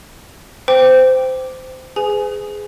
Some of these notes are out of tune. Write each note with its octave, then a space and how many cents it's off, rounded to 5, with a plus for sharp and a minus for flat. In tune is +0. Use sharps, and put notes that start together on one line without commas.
C5 -20 G5 +0 D6 +0
G#4 +0 B4 +40 G#5 +15